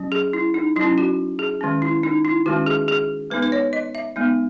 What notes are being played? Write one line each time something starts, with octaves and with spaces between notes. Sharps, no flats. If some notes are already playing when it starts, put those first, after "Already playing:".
Already playing: F#3 C#4
G#4
E4
D#4
F#3 E4
C#4
F#4
G#4
D#3 G#3 C#4
E4
D#4
E4
D#3 G#3 C#4 F#4
G#4
G#4
G#3 B3 D#4 B4
B4
C#5
D#5
E5
G#3 B3 D#4